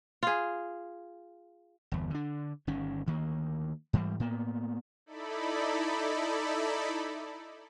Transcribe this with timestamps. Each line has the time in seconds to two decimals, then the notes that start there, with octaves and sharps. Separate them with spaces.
0.23 F4 G#4
1.92 G1 E2
2.11 D3 D4
2.67 G1 D#3 C#4
3.06 D2 D#3 A#3
3.93 G#2 E3 F3 G3
4.20 A2 A#3 B3
5.06 D#4 E4 A4 D5 B5